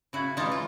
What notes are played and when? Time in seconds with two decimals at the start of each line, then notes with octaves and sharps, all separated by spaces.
0.13 C#3 E4 F#4
0.37 E3 G#3 D#4 F4
0.52 F4